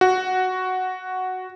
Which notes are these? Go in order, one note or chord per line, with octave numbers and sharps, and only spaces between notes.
F#4